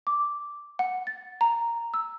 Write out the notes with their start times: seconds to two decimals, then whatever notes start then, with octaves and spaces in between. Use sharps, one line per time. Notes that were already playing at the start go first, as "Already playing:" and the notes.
0.07 D6
0.79 F#5
1.07 A6
1.41 A#5
1.94 E6